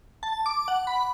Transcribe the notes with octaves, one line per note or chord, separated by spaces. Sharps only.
A5
D6
F#5
B5